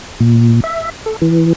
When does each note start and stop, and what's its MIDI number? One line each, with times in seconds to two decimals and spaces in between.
0.20 0.60 46
0.64 0.90 76
1.06 1.16 69
1.22 1.53 52